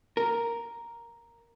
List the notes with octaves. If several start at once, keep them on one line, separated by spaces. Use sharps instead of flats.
A#4